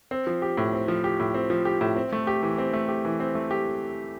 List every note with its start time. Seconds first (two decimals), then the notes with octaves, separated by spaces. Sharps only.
0.11 C4
0.27 F3
0.42 G4
0.57 A2
0.73 C4
0.88 F3
1.04 G4
1.20 A2
1.34 C4
1.50 F3
1.65 G4
1.81 A2
1.96 C4
2.13 A3
2.27 G4
2.43 E3
2.58 C4
2.73 A3
2.89 G4
3.05 E3
3.20 C4
3.35 A3
3.51 G4